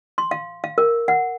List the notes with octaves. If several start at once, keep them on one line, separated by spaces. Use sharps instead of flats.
C6
F5
F5
A#4
F#5